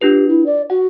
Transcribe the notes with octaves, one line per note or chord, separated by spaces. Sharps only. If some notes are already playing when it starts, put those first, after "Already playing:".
D4 F4 G4 B4
E4
D5
F#4 F#5